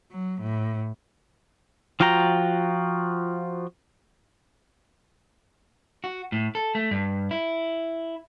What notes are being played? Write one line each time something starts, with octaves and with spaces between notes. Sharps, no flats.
F#3
A2
F3 F4 F#4 G5 A#5
F#4
A2
A4
A3
G2
E4